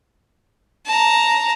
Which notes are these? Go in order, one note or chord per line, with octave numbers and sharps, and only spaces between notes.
A5 A#5